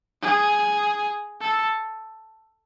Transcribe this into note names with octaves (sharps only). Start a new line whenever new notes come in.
G#4
A4